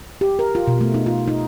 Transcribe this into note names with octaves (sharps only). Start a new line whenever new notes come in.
G4
A#4
F4
B2
A3
D#4
F4
D#4